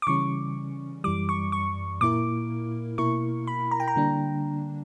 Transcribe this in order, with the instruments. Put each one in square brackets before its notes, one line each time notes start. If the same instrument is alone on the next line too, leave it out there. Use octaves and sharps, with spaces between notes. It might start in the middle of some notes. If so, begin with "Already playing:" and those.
[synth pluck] D6
[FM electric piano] C#3 E3 G3 C#4 [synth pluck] C#6
[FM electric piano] F#2 E3 G3 [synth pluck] D6
[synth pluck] C#6
C#6
[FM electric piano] A#2 A#3 E4 A#4 [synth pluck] D6
[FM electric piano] B2 A#3 E4 A#4 [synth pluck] C#6
[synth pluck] B5
A#5
G5
A#5
[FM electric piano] D3 G3 A#3 D4